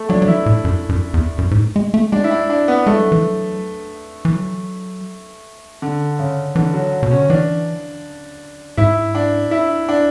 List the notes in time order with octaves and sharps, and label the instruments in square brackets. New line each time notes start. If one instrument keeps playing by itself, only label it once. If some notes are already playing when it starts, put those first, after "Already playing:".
Already playing: [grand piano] A3
[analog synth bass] F#3 [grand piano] D4
[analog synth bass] F#3
[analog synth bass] E3 [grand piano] E4
[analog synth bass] A2
F#2
F#2
E2
F#2
G#2
A2
G#3
A3
[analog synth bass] G#3 [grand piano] D4
[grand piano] E4
D4
D4
B3
[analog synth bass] G#3 [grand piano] A3
[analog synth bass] F#3
E3
F#3
E3
F#3
[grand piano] D3
C#3
[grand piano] D3 [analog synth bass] E3
[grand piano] F#3
[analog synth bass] B2
[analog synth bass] C#3 [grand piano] C#4
[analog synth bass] D3
[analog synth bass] E3 [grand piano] D4
[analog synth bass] G#2 [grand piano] E4
[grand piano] D4
E4
D4